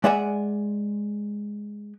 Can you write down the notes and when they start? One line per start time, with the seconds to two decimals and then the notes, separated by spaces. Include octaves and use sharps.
0.04 G#3 D5 E5 F#5 G#5